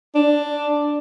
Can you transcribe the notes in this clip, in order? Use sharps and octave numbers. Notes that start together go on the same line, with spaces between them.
D4